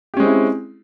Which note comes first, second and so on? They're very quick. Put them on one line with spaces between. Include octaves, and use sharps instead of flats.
G4 C#4 G#3 C4 E4